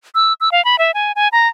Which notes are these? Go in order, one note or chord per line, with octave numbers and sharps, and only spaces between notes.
E6
E6
F5
B5
E5
G#5
G#5
A#5